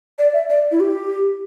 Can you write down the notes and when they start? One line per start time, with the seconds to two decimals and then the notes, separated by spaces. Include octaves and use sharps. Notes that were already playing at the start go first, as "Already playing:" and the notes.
0.19 D5
0.34 E5
0.50 D5
0.71 E4
0.80 G4